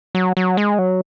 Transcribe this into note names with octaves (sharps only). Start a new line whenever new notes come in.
F#3
F#3
G#3
F#3